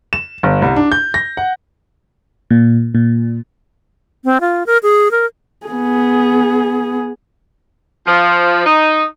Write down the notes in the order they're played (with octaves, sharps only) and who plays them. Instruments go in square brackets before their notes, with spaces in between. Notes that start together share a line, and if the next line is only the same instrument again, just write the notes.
[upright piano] E7
G1
C2
D4
G6
A#6
F#5
[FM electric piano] A#2
A#2
[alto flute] C4
F4
A#4
G#4
A#4
[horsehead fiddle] B3 G#4
[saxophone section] F3
D#4